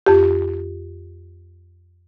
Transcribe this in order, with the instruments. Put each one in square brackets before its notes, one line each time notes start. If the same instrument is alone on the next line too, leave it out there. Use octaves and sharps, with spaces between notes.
[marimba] F2 G4